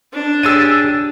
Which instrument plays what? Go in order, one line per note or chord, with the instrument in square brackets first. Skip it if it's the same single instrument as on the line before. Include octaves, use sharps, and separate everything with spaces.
[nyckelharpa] D4
[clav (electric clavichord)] G4 G#4 C#5 [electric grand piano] E6 A6 D#7